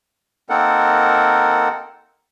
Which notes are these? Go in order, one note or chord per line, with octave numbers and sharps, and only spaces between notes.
A#3 C4 D#4 A4 A#4 F#5